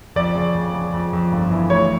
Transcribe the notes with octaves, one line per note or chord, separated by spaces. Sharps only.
F2 D5
C#3
F2
C#3
F2
F2
G1
E3
D2 C#5